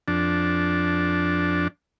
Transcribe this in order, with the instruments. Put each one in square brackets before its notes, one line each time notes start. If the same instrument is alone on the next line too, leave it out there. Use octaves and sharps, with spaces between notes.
[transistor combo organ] F2 D4